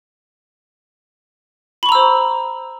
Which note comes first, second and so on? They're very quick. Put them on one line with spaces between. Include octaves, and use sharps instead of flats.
B5 C#6 A#5 E6 C5